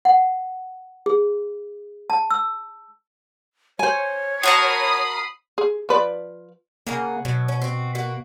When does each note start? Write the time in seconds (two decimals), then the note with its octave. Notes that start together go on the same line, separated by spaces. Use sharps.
0.05 F#5
1.06 G#4
2.10 A5
2.31 E6
3.79 C5 C#5 G#5
4.43 F#4 A#4 A5 B5 D#6 C7
5.58 G#4
5.89 F3 B4 D5
6.87 C#3 A#3 G#4 F#5
7.25 B2 F#3
7.48 C#4
7.62 C4 F#4
7.95 A#3 B3 F#4